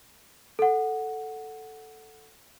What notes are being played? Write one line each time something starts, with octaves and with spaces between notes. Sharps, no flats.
A4 F#5